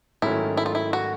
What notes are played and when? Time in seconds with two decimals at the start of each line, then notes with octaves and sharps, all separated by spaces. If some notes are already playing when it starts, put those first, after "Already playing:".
0.22 G#2 D#3 F#3 A3 C#4 E4
0.57 E4
0.66 F4
0.75 E4
0.93 F#4